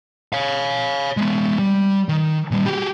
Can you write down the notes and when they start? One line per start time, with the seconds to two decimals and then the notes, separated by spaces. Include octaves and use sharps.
0.33 C#5 F5
1.17 G#3 B3
1.59 G3
2.09 D#3
2.51 A#2 G3
2.66 F#4 G4